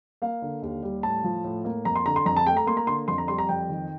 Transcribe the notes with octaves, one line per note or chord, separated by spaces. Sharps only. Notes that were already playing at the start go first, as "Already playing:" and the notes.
A#3 F5
D3
D#2
G3
A2 A5
F3
A2
A#3
F2 A#5
C6
D3 A#5
C6
F2 A#5
A5
A3 G5
A#5
A#3 C6
A#5
D3 C6
F2 C6
A#5
G3 C6
A#5
F2 G5
D#3